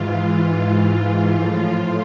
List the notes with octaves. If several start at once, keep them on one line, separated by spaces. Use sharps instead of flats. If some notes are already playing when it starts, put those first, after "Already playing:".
Already playing: G#2 E3 F4
A2 F3